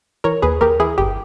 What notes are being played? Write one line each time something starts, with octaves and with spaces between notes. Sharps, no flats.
E3 A#4 C#5
D#2 G#4 B4
D#2 G4 A#4
E3 E4 G#4
G1 G4